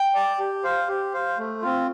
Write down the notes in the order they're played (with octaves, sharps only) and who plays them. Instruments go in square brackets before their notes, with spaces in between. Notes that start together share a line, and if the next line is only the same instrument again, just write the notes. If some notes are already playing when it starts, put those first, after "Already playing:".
Already playing: [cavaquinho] G5
[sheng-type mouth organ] D5 A5
G4
C5 F5
G4
C5 F5
A3
C4 F4